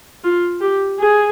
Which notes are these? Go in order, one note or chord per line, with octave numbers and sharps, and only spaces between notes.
F4
G4
G#4